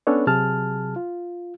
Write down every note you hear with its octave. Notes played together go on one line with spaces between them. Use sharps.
B3 C#4 D4 A4 B4 C#5
C3 F#3 G#4 A5 F6
F4